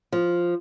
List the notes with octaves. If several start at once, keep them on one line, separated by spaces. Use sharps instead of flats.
F3